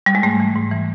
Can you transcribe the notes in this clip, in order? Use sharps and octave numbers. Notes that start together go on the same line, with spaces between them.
G3
G#3
G#2 A3
E3
G#2
E3